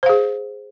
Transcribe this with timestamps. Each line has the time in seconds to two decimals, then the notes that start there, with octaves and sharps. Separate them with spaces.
0.03 C5
0.06 F5
0.09 G#4